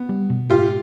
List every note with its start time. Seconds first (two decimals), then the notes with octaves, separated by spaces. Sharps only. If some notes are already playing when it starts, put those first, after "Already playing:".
Already playing: B3
0.09 G3
0.30 B2
0.50 G#2 F4 G4